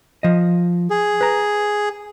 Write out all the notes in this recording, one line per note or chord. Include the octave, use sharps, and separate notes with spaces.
F3 D#5
G#4
B4 A#5